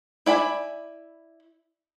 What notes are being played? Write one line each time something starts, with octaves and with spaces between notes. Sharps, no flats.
E4 D5 G#5 B5